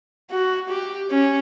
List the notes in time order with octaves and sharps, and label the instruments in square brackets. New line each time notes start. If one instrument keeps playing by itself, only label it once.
[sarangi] F#4
G4
C#4